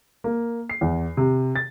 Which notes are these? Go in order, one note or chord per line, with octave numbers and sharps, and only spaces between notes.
A#3
C7
E2
C3
A6